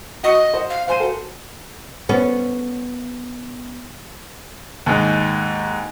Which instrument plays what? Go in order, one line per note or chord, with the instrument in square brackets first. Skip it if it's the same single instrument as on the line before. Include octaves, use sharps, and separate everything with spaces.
[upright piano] F#4 C#6 C#7 [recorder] D#5
[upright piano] C5 F#5
[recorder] F5
[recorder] C5 [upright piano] F5 G#5 D#7
[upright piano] F#4 A4 A#4
[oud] B3 C#4
[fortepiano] D#2 G#2